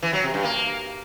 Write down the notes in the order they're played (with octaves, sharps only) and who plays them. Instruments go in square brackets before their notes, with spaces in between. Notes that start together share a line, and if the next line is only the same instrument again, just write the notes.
[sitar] E3
F#3
C3
G2
A#3